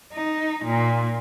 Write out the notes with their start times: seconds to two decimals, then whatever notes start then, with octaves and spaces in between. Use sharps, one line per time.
0.12 D#4
0.65 A#2